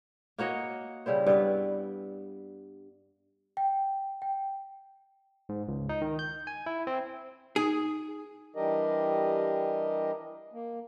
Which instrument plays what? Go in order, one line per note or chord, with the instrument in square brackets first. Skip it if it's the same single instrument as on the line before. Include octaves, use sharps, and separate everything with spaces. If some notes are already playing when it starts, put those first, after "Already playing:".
[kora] A#3 F#4 C#5 D#5
C#3 G3 E4 C5
G2 B3 B4
[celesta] G5
G5
[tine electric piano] G#2
C#2
D#4
D#3
G6
G#5
E4
C4
[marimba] D#4 [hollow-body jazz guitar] G#4
[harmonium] E3 G3 D4 G4 A#4 D#5
A#3